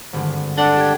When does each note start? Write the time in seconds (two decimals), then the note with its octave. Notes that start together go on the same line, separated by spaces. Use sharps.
0.13 G#1 G2 D3
0.58 D4 A4 F#5
0.77 G4 G5 G#6